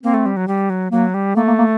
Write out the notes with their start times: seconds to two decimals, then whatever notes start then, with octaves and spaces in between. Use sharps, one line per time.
0.03 A#3 C4
0.14 A3
0.26 G3
0.37 F#3
0.48 G3
0.70 F#3
0.92 F#3 A#3
1.14 G3
1.36 A3 A#3
1.47 A#3
1.58 A#3